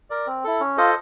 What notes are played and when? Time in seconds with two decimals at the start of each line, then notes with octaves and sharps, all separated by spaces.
0.10 A#4 D5
0.27 C4
0.44 E4 A4
0.60 C#4
0.77 F4 A4 C5 D#5